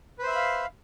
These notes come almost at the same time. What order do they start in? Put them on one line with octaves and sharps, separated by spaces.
B4 C5 E5 B5 F5